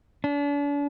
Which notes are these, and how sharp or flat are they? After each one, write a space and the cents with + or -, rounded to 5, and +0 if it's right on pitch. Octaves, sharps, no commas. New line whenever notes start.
D4 -40